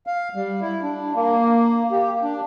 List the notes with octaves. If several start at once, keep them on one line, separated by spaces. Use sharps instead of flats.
F5
G3
E4
D4
A#3
G4
D4